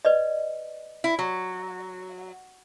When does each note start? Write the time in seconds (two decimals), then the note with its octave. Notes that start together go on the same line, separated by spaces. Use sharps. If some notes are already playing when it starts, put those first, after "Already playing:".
0.05 B4 D5 D#5
1.04 E4
1.19 F#3